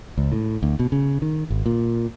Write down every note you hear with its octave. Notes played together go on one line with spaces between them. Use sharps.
C#2
A2
D2
B2
C#3
D#3
G#1
A#2